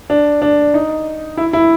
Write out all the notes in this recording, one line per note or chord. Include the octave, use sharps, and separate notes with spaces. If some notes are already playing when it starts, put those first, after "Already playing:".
D4
D4
D#4
E4
E4